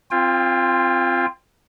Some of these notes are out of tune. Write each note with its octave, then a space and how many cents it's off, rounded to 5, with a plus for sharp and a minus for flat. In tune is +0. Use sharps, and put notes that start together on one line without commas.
C4 +0 F4 -5 G5 +40